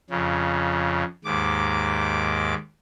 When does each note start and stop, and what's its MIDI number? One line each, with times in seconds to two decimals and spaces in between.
0.10 1.04 41
0.10 1.04 49
1.25 2.54 39
1.25 2.54 44
1.25 2.54 86